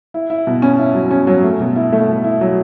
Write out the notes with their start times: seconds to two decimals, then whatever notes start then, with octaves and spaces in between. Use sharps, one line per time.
0.14 E4
0.30 E4
0.47 B2
0.62 C#4
0.79 E4
0.94 F#3
1.11 C#4
1.27 F#3
1.44 A3
1.60 B2
1.76 E4
1.92 A3
2.09 B2
2.24 E4
2.41 F#3